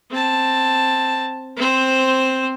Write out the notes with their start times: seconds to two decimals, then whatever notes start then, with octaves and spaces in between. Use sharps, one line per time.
0.11 C4 A5
1.57 C4 C5